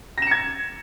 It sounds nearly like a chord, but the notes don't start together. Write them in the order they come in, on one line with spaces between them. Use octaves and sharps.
A#6 E7 C#7 G#6